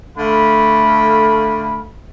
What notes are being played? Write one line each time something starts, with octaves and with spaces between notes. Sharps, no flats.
D3 A3 F5 B5